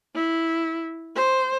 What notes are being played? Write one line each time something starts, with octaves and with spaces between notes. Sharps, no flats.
E4
C5